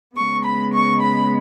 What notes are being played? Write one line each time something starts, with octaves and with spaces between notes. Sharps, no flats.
C#3 G#3 B3 C#6
B5
C#6
B5